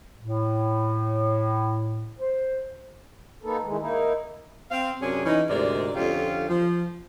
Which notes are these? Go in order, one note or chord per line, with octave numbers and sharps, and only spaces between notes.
A2
C5
A#3 B3 D#4 A4
D#3 E3 G#3
A#3 D#4 E4
C4 F5
F#2 C3 C#4 D4 G#4
E3 C#4 D#4
D2 G#2 C3 A#4 D5
F2 D3 C#4 F4 G4 F5
F3